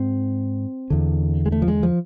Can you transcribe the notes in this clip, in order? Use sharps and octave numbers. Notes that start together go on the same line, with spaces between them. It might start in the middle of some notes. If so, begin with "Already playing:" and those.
Already playing: G#2 C4
E2 D3
G#3
A3
F3
G#3
F3